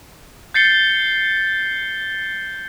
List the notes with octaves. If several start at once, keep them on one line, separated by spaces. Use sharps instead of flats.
G6 A6 C7 C#7 G7